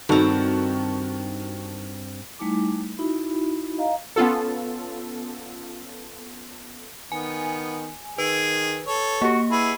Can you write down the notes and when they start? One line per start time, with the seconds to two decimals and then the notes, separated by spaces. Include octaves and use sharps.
0.09 G2 D#3 C4 F#4 A4
2.39 G3 A3 D#4 E4 G#5 D6
2.99 D#4 E4 F#4 E5 B5
3.78 D#5 F5 A#5
4.16 B3 C#4 F4 A4
7.12 D#3 B3 G#5
8.18 D#3 G#4 B4
8.87 A4 C#5
9.22 A#3 F#4 G4
9.51 E4 G#4 B4 F#5